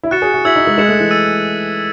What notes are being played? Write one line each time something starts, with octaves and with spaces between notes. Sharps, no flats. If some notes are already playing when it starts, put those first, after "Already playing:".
E4
F#4 F#6 A6 C#7 E7
G#4
F#4
E4 E6 G#6 B6 F#7
D#4
G#3
G#3 G#6 C#7 E7
A3
E3
E6 A6 D#7